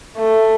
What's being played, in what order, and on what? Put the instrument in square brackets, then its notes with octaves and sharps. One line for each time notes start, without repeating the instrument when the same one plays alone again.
[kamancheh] A3